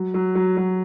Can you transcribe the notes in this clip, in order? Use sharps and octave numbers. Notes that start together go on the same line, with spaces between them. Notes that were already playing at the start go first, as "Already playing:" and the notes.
Already playing: F#3
F#3
F#3
F#3